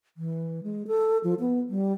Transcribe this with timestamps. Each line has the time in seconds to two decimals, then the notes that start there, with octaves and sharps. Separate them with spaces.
0.17 E3
0.63 G#3
0.87 A4
1.24 F3
1.40 B3
1.69 G3